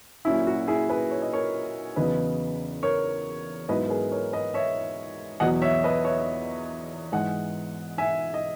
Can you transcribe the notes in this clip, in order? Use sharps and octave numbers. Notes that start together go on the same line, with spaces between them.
A#2 F#3 C#4 E4
F#4
E4 G#4
G#4 B4
C#5
D#5
A#4 C#5
E2 C#3 F#3 B3 D#4 B4 D#5
A#4 C#5
G#2 F#3 B3 E4 B4 D#5
A#4
G#4 B4
A#4 C#5
B4 D#5
C#5 E5
E2 B2 F#3 D#5 F#5
C#5 E5
B4 D#5
C#5 E5
G#2 E3 G#3 D#5 F#5
E5 G#5
D#5